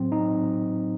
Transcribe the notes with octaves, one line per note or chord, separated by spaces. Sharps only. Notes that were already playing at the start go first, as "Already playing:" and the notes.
Already playing: A2 F#3 C4
D#4